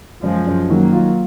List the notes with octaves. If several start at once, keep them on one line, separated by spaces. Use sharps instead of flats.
F#2 F3 G#3
F#2
D#3 F#3 A#3
F4